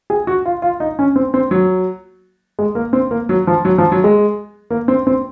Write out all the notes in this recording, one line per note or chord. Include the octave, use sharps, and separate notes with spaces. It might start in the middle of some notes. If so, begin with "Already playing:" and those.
G#4
F#4
F4
F4
D#4
C#4
C4
C4
F#3
G#3
A#3
C4
A#3
F#3
F3
F#3
F3
F#3
G#3
A#3
C4
C4